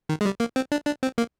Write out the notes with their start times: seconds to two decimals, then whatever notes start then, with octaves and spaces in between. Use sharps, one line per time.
0.09 D#3
0.21 G#3
0.25 G3
0.40 A#3
0.56 C4
0.72 D4
0.86 D4
1.03 C4
1.18 A#3